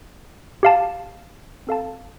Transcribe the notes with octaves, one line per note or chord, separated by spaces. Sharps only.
G4 F5 A5
C4 A4 F5 A5